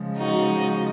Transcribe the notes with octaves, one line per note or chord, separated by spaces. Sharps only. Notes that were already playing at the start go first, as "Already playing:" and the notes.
Already playing: C#3 F3 G#3
D#4 F#4